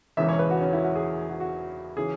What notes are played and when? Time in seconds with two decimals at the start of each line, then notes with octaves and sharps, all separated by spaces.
0.17 E1 E2 C#3 E3 E5
0.29 C#5
0.39 B4
0.50 F#4
0.61 C#4
0.73 E4
0.84 F#4
0.95 G#4
1.29 F#4
1.40 F#4
1.97 C#3 E3 G#4